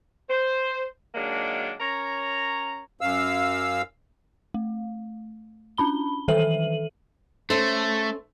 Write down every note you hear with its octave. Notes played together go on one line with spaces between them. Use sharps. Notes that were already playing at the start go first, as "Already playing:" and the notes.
C5
D#3 F#3 G#3 A#3 D4
C#4 A#4 C#5 A#5
F#2 F5 E6
A3
C#4 D4 B5 G7
D#3 E3 A4 E5 D#7 F#7
A3 C#4 A4 C5